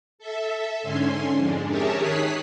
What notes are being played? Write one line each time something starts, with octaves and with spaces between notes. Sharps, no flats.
A4 E5
G#2 D3 C#4 G#5 C6
F2 G#2 G#3 D4
G4 G#4 A#4 C#5 E5 A5
D#3 C#5 D#6 F#6 B6 C7